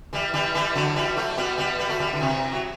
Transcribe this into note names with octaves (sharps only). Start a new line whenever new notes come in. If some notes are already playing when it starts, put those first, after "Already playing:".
E3 G3
E3 G3
E3 G3
D3 F#3
E3 G3
F#3 A3
G3 B3
G3 B3
G3 B3
F#3 A3
E3 G3
D3
C3 E3
F#3